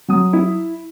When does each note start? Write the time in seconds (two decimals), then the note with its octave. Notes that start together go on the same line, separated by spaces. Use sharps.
0.08 F#3 D#6
0.33 E4